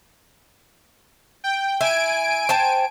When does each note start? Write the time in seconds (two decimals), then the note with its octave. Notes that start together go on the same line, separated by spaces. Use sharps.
1.44 G5
1.81 E4 G#5 D7
2.49 C5 G5 A5